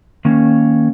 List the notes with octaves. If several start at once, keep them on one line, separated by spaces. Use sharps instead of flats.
D#3 A#3 C#4